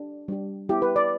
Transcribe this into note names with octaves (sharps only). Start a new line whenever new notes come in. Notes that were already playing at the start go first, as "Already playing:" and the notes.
Already playing: D4 G4
G3 D4 G4
G3 B3 E4 G4
B4
D5